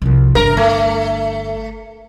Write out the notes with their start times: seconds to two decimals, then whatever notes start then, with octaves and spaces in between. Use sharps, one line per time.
0.02 C2 F3
0.35 G1 D4 A#4
0.57 A3